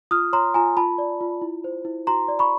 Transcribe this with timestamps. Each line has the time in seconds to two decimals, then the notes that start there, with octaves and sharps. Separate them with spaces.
0.11 F4 D#6 F6
0.33 C#5 A#5 C6
0.54 F4 G#5 A#5
0.77 F4 A5 B5
0.98 D5
1.21 F4
1.42 E4
1.64 C5
1.85 E4
2.07 F#4 A#5 C6
2.28 D5
2.39 B5 C#6